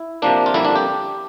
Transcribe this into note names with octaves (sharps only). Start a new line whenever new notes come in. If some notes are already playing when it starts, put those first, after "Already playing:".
Already playing: E4
C3 F3 A#3 D4
F4
F2 D3 G3 A#3 E4
D4
G4